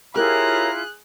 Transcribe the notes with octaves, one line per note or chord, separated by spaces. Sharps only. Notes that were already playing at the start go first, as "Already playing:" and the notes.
E4 F4 G4 G#4 A#4 C#5 A#5 F#6